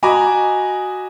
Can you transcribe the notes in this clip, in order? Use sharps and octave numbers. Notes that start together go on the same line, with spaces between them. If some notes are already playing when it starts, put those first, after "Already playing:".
F#4 D#5 G#5 A#5 B5 D6